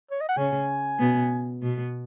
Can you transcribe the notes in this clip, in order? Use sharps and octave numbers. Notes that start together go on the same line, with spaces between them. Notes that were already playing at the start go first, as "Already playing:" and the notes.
C#5
D#5
F#5
C#3 C#4 G#5
B2 B3
B2 B3